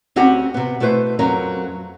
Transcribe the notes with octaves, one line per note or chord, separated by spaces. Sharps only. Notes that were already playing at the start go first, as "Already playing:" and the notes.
D2 C4 C#4 F#4 G4 F#5
C3 B3
B2 A3 E4 B4 C5
F2 F#3 C#4 A#4